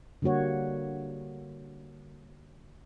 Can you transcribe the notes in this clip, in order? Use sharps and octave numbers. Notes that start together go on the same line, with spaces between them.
D3 G3 A#3 F#4 C#5